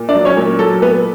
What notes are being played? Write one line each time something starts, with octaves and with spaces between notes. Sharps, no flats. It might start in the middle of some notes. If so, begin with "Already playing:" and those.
Already playing: A#2
D4 D5
F#3
C#4 C#5
A#2
F#3 A4
A#2 B3 B4